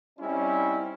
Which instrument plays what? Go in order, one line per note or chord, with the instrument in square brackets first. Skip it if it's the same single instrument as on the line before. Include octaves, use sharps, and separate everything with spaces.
[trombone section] G3 C4 C#4 D#4 E4